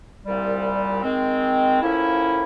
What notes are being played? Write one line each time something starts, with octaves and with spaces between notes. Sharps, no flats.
C2 A#2 G3
D#3 G#3 C4
A2 F3 A#3 C#4 E4